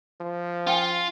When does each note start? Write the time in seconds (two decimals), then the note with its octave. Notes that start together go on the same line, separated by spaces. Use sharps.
0.20 F3
0.67 C#4 F4 G5 G#5